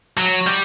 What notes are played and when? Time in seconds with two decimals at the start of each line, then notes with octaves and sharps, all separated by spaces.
0.17 F#3
0.47 G3